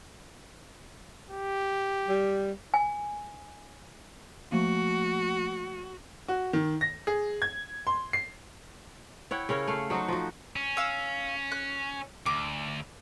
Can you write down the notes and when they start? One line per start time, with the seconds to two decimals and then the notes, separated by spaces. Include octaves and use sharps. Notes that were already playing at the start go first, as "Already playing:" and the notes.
1.31 G4
2.08 G3
2.74 G#5
4.52 F3 A3 A#3 F#4
6.28 F#4
6.53 D#3
6.81 A#6
7.07 G#4
7.42 G#6
7.87 C6
8.13 C7
9.31 E4 C#5 F#5 G5
9.49 C#3 C#4 A#4 C#5
9.67 A3 F5
9.90 F#3 D#4 F#4 C5
10.08 F3 F#4
10.56 C#4
10.77 F5 E6
11.52 F#6
12.26 D2 D6